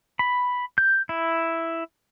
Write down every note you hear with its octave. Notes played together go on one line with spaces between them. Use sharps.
B5
G6
E4